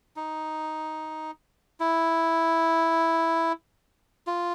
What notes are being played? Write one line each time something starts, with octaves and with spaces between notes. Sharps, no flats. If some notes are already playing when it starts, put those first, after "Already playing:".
D#4
E4
F4